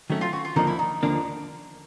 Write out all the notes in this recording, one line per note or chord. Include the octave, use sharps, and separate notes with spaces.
D#3 F#3 A3 C#4
F4
F#4
F4
D#2 D3 F3 A#3 D4 D#4
E4
D#4
D#2 D3 F3 A#3 D4